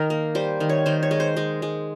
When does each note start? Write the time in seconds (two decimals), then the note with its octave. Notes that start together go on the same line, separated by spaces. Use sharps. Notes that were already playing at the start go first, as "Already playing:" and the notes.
Already playing: D#3 A#4
0.10 A#3
0.35 G3 C5
0.60 D#3
0.69 C#5
0.86 D#3 C5
1.03 C#5
1.11 G#3
1.20 C5
1.37 G#3
1.62 G#3